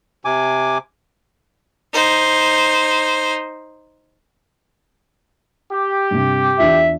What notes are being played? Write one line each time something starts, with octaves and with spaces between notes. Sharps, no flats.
C3 G#5 D6
D#4 C5
G4
G2 C3
E2 D4 F4 E5